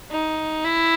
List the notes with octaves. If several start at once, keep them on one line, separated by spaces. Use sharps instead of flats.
D#4
E4